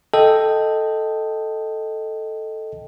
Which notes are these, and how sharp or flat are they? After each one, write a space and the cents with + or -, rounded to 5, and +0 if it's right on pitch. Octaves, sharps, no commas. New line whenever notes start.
A4 +0 D#5 +0 G5 +0